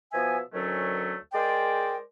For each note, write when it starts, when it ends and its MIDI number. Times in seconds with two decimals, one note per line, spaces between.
0.13 0.38 47
0.13 0.38 53
0.13 0.38 59
0.13 0.38 76
0.13 0.38 80
0.53 1.14 38
0.53 1.14 51
0.53 1.14 54
0.53 1.14 57
0.53 1.14 61
1.33 1.98 56
1.33 1.98 68
1.33 1.98 70
1.33 1.98 72
1.33 1.98 74
1.33 1.98 79